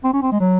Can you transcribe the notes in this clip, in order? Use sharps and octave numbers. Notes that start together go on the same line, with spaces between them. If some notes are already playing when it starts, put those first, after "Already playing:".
C4
C#4
C4
G#3
F#3